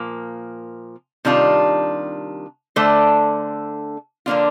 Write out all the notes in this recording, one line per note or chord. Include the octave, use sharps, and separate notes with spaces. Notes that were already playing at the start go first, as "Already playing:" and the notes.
Already playing: A#2 F3 A#3
C3 D#3 G3 D4 F4
D3 A3 D4 A4 C5
D3 F3 A#3 D4 F4